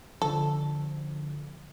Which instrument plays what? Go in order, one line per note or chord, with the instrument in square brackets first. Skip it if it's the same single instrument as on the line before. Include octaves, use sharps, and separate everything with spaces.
[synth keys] D3 F3 [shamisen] A4